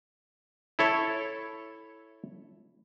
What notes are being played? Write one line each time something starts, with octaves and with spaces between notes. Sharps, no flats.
E4 A4 C#5